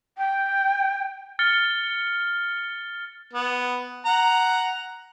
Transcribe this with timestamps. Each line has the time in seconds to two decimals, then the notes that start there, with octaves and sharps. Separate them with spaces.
0.18 G5
1.39 F6 A6 C#7 G7
3.33 B3
4.05 F#5 A#5